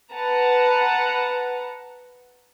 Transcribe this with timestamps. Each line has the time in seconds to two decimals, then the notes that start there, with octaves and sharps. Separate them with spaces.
0.13 B4 F#5 A5 A#5